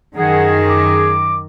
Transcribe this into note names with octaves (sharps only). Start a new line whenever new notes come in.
F#2 D#3 G#4 F#5
D6